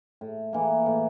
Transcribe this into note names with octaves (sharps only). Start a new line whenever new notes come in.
A2
E3 A#3
A2